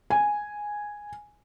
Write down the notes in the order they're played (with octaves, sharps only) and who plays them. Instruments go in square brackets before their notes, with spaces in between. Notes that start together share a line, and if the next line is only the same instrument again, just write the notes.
[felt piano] G#5